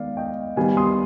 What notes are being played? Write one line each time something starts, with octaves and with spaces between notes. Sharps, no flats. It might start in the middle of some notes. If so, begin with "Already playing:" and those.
Already playing: D#3 G#3 B3 D5 F5
D#5 G5
D#3 G3 B3 F5 G#5
C6 D#6